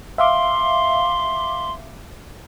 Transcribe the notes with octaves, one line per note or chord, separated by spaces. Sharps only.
E5 F5 C6 D6